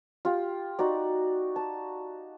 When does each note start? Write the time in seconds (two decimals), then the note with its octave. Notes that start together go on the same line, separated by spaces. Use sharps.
0.25 F4 G4
0.79 D#4 F#4 D5
1.56 A5